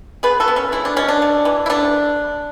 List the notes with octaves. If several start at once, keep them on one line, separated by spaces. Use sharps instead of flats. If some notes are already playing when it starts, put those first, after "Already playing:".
B3 G#4 B4
F#4 A4
B3
C#4
G#3 E4
D4
B2 C#4
D4
A3
E3
E4
A3 D4